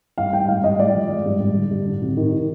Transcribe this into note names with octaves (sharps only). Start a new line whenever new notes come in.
G2 F5
G2 G5
G#3 F5
G2 D#5
G#3 D5
F3
G#3
G2
G2
D3
G2
D3
C3
D#3
D#3